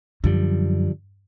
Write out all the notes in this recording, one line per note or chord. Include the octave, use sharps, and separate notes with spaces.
F#2 D3 F3 G3